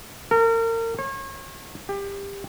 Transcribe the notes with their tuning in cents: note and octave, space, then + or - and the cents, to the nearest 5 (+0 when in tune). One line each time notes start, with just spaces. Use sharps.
A#4 -35
C#5 -40
G4 +25